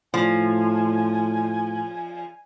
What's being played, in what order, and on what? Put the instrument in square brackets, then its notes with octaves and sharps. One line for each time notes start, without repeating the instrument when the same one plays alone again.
[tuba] A2 [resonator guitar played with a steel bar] F3 [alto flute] G#5